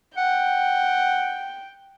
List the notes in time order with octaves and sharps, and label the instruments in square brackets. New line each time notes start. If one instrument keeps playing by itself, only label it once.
[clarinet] F#5 [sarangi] G5